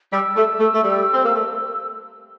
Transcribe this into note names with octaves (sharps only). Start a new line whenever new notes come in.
G3 E6
A3
A3
A3
G3
C4
A#3
A3